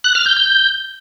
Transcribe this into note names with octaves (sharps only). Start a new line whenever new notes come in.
F#6
F6
G6
G6